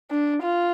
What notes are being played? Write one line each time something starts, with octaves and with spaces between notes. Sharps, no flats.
D4
F4